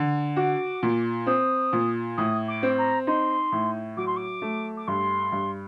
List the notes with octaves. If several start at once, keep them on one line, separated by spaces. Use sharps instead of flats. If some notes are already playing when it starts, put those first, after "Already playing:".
Already playing: D3
F#4 D6
A#2
C4 D#6
A#2
A2 D#6
D6
C4
A#5
D#4 C6
A2
F#3 D6
C6
D6
A3
D6
G2 C6
G2